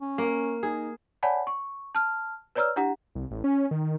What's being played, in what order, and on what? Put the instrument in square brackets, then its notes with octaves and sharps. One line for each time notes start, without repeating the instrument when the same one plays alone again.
[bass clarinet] C#4
[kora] A#3
[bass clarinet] D#4 [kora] G#4
[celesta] C#5 D5 F#5 G#5 A5 B5
C#6
A5 F6
B4 C#5 D5 A#5 E6 F6
D4 E4 G4 F#5 A#5
[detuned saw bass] C2
A1
C#4
D#3